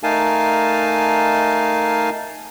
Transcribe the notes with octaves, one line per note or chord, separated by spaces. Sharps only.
A3 D#4 A#4 F5 G#5 A5